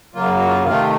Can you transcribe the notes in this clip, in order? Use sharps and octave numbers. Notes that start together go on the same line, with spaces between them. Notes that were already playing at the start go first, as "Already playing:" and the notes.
F#2 C#3 F#3 A#3 F4
F#4
F4
C3 D#3 A3 F4